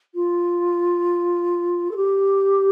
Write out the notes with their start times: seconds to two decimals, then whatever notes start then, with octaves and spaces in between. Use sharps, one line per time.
0.15 F4
1.91 A4
1.96 G4